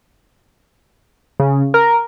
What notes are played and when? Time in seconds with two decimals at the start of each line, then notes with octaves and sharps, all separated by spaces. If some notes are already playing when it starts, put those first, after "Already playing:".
1.40 C#3
1.74 A#4